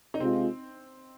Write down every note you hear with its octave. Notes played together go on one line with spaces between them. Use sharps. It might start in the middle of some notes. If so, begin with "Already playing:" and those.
D#4
C3 G#3 C4 F4